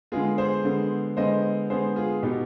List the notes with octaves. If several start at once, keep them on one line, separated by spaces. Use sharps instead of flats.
D3 G#3 B3 F4 G#4
G#4 C5
D3 G#3 B3
D3 G#3 B3 C5 D#5
D3 G#3 B3 G#4 C5
F4 G#4
B2 B3 D#4 G4